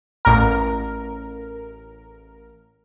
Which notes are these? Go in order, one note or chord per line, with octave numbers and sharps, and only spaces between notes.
A1 A#4